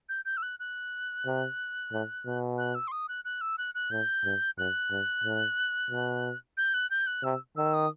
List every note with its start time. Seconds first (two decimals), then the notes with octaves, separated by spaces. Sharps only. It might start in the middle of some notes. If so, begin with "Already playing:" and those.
0.09 G6
0.25 G6
0.37 E6
0.43 F#6
0.60 F#6
1.25 C3
1.92 A2
2.26 B2
2.58 F#6
2.75 E6
2.88 C6
2.92 D#6
3.09 F#6
3.25 F#6
3.41 E6
3.58 F#6
3.75 F#6
3.91 A2 G6
4.24 G2
4.58 F#2 F#6
4.91 G2
5.24 A2
5.91 B2
6.57 G6
6.74 F#6
6.91 G6
7.07 F#6
7.23 C3 E6
7.57 D#3 E6
7.74 D#6